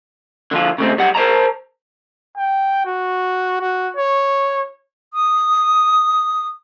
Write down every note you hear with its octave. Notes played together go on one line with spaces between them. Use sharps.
D3 F3 F4
C#3 A3 C4
B1 G3 F#5
A#4 C5 D5 A5 A#5
G5
F#4
F#4
C#5
D#6